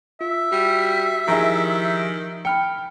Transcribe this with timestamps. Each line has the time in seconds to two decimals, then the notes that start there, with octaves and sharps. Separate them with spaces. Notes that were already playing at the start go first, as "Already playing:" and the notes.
0.21 F4 E5
0.52 G3 F#4
1.28 D#3 F3 D#4 E4 G4 G#4 A#5
2.45 G5 B5 F6 C#7